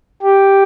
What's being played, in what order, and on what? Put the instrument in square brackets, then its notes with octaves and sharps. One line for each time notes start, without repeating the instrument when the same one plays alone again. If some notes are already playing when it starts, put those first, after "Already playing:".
[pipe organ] G4